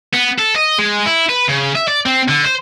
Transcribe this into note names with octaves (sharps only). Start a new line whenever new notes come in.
B3
A4
D#5
G#3
E4
B4
C#3
E5
D5
C4
D3
C5